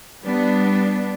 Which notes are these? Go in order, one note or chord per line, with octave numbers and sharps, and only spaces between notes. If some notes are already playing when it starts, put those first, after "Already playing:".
G3 B3 D4